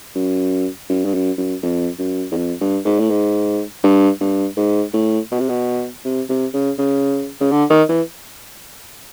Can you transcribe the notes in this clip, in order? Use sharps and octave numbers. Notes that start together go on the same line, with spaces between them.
F#2
F#2
G2
F#2
F#2
F2
F#2
E2
F2
G2
G#2
A2
G#2
G2
G2
G#2
A2
B2
C3
B2
C3
C3
C#3
C#3
C#3
D3
D#3
E3